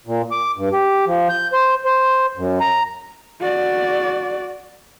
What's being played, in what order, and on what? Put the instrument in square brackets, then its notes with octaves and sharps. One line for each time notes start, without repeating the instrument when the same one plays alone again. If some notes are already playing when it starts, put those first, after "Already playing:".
[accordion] A#2
D6
G2
G4
F3
G6
C5
C5
F#2
A#5
[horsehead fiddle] F#4 D5